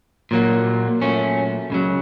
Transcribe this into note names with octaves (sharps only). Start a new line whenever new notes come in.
A#2 F#3 A#3
A#2 F#3 A3 C#4
C#2 C#3 F#3